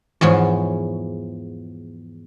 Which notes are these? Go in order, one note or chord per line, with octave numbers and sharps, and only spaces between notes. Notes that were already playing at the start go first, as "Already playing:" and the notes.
E2 G#2 F3 C#5